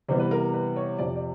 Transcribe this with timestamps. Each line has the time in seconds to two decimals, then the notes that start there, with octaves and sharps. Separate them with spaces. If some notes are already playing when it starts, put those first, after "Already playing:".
0.08 C3 E3 G3 B3 C5
0.19 B4
0.31 A#4
0.54 B4
0.76 C#5
0.98 F2 C3 F3 D5
1.16 D5